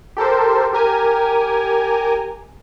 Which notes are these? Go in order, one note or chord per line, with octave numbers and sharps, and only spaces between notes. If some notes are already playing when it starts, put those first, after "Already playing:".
G4 A4 A#4 C5
G4 A#4 G#5